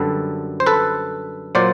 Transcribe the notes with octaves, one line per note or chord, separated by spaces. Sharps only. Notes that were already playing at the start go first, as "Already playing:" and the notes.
Already playing: F#2 D3 G3 A4 B4
C5
A4 B4
A#2 F#3 C5 D5